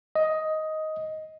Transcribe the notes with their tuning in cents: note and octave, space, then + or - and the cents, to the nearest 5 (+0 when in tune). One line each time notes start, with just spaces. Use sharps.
D#5 +10